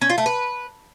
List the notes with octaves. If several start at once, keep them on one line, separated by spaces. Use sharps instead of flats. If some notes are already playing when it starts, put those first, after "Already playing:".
C#4
F4
A3
B4